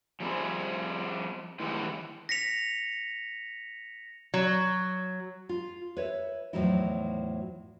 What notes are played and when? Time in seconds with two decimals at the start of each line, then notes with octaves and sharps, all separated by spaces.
0.20 F3 G3 C4 G#4
1.60 A2 D#3 E3 F#3 G#3 G4
2.29 A#6 B6 C#7 F7
4.34 F#3
5.49 F4
5.97 B4 C#5 E5
6.53 E2 A2 F3 F#3 D#4 E4